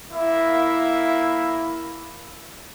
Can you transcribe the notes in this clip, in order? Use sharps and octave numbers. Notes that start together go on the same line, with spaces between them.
A#3 E4 E5